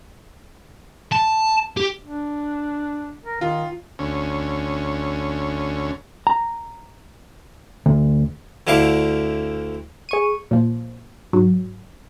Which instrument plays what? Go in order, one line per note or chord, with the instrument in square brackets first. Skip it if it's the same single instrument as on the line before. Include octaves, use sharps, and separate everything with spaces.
[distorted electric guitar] A5
G4
[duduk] D4
A#4
[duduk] D#3 [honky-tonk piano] F4
[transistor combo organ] D2 C#4
[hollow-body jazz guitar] A#5
D2
[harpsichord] D2 D3 E4 F5 C#6 D6
[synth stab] G#4 C#6 D#7
A#2 F3
G#2 F#3